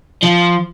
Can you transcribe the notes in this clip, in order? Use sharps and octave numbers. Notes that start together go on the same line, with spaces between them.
F3